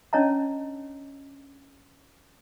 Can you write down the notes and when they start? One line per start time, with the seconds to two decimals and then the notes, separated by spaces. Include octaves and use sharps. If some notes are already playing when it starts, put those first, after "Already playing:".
0.13 C#4 D4 C#5 D#5 A5 A#5